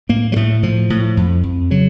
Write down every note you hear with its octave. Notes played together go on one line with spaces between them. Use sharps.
A2 A#3
F#3
A2 A3
A2 F3
A2
F2
F2
C#3 F#3